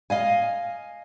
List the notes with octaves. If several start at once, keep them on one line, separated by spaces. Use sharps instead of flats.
D#5 F5 G#5